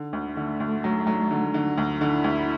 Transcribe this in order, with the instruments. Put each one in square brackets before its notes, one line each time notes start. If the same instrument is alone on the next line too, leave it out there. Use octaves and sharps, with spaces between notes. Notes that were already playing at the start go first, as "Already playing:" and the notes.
Already playing: [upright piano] D3
D2
[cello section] A3
[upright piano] D3
D2
F#3
F#3
D3
D3
D2
[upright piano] D3 [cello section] E4
[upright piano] D2